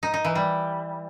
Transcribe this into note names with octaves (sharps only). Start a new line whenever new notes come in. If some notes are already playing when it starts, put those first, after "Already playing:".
D#4
D#4
E3
G3